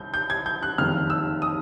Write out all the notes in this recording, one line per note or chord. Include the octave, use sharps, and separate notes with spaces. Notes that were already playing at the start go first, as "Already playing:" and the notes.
Already playing: C2 G6
G6
G#6
G6
F#6
F#1 F2 C3 D#3 G3 F6
E6
D#6